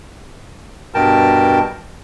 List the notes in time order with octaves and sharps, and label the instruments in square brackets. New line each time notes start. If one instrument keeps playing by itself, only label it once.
[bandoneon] G2 B2 A#4 G5 A5